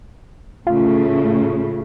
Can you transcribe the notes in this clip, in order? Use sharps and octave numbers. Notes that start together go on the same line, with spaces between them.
A2 C#3 A3 F4